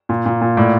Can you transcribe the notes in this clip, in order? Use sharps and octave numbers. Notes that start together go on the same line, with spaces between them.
A#2
A#2
A#2
A2 D5